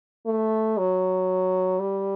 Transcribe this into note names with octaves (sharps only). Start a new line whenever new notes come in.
A3
F#3
G3